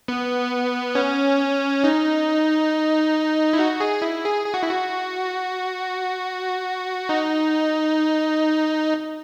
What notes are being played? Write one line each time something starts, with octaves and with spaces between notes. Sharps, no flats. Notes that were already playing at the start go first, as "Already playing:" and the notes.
B3
C#4
D#4
E4
F#4
G#4
E4
G#4
G#4
F#4
E4
F#4
D#4